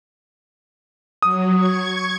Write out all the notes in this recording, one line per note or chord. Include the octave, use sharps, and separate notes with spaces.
F#3 D#6
C#6 G#6